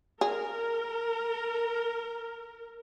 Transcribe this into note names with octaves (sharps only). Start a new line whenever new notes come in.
G#4 A#4